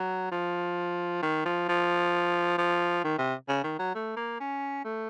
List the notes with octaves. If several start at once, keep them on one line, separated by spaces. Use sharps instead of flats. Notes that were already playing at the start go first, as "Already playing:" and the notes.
Already playing: F#3
F3
D#3
F3
F3
F3
D#3
C3
C#3
D#3
F#3
A3
A#3
C#4
A3